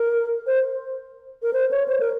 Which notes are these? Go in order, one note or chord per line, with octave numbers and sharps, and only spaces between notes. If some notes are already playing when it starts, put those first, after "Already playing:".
Already playing: A#4
C5
A#4
C5
C#5
C5
A#4